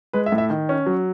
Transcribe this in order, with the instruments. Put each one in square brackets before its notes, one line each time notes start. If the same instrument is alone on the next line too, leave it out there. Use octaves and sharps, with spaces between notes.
[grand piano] G#3 B4
E5
A2
E5
D#3
C#4
F#3